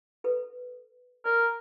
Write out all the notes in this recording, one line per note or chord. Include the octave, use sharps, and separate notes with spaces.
A4 B4
A#4 D5